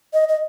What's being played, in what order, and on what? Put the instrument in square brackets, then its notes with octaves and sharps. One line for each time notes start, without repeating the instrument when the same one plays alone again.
[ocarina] D#5
D#5